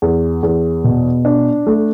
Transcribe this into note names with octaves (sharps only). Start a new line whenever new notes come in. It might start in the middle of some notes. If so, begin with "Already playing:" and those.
E2
E2
B2
D4
A3